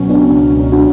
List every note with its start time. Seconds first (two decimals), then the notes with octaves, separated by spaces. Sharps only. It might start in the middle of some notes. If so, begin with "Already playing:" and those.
Already playing: C#2 B2 F#3 C#4
0.10 B3 D4
0.72 D4 F#4